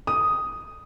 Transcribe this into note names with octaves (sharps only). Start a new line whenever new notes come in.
D#6